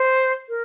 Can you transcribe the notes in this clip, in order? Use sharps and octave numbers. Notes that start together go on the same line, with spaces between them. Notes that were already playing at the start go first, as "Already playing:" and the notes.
Already playing: C5
A#4